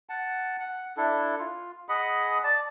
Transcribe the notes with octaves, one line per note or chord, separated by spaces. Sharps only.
F#5 A5
F#5
D4 E4 A4
F4
G#4 D#5 F#5 B5
D5 A5